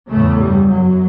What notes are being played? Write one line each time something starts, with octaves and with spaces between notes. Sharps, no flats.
E2 A2 C#3 A3
G2 G3
F#2 F#3